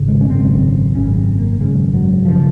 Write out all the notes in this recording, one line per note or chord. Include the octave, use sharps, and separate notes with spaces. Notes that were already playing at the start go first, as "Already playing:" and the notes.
Already playing: G#1 C#3
G#3
C#4
G#1 F#2 C#3 C4
G#1 F#2 C#3 C#4
C4
A#3
G#1 F#2 C#3 G#3
F#3
F#1 C#3 F3